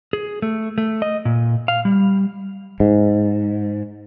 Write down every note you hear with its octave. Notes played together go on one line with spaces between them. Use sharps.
G#4
A3
A3
D#5
A#2
F5
G3
G#2